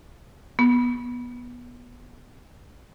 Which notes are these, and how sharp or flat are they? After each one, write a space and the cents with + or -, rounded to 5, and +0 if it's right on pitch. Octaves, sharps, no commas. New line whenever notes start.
B3 -20